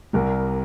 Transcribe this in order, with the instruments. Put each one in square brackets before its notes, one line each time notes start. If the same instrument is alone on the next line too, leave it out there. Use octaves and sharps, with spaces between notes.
[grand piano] C2 C3 G3 A#4